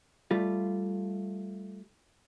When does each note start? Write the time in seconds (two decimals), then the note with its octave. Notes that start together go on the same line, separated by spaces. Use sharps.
0.31 G3 A3 F4